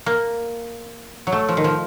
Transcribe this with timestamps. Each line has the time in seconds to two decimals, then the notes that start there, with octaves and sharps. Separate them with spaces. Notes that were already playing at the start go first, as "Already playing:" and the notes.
0.06 A#3
1.27 F#3
1.32 A3
1.49 F3
1.57 D#3
1.64 F3